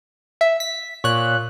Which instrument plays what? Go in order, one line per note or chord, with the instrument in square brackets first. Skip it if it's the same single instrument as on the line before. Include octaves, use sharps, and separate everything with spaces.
[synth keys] E5
B6
[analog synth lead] A#2 [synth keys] C#5 F#6